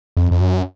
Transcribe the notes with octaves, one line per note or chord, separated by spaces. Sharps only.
F2
F2
F#2